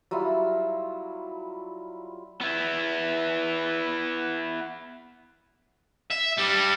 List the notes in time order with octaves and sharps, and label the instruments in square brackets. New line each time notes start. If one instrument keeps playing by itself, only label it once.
[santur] F#3 G3 E4 F4
[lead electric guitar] B3 E4
[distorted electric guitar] E5
G3 D4